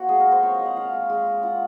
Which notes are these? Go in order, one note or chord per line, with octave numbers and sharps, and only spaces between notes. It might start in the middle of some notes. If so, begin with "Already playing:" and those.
Already playing: A#3 F#4 C5
G#3 G#4
A#4
F4
C5
C4 C#5
D#5
G#3
F#5
F4 F5
G#3
G#3
G#3
F4 F#5